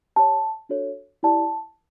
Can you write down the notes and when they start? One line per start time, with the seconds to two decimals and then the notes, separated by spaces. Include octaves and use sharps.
0.16 G4 C#5 A5
0.69 D4 F#4 A4 C#5
1.23 E4 G4 D5 A5